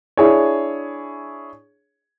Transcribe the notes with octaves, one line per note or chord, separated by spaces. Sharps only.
D4 E4 G#4 C#5